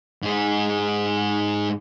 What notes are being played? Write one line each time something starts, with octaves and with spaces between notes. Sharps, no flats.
G#2 G#4